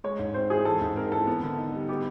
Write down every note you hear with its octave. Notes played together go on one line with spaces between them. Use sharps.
G#3 C#5
G#2
C4 C5
E3 G#4
G#3 A4
G#2
C4 A#4
E3 A4
B3
D3
D#4
G3
B3 G4